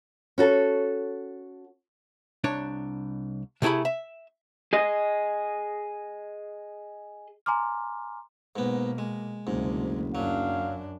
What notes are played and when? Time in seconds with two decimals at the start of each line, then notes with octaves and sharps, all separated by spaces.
0.38 C#4 F#4 A4
2.44 C2 D4 C#5
3.62 C3 A3 E4 G#4 B5
3.85 E5
4.73 G#4 D#5
7.46 G#5 A#5 C6 D6 F6
8.56 G#2 B2 A#3 B3
8.98 G#3
9.47 F#1 D2 G#2 C3
10.15 F#2 F#3 D4 F5